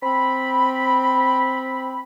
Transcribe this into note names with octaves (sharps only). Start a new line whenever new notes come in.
C4 B5